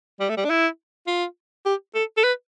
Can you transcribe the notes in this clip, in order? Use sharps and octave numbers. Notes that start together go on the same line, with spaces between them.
G3
A3
G3
D4
E4
F4
G4
A4
A4
B4